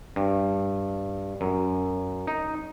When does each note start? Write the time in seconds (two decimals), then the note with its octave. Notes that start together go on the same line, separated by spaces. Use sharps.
0.16 G2
1.41 F#2
2.27 D#4